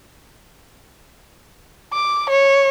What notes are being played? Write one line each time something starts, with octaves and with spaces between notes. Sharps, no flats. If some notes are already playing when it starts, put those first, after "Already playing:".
D6
C#5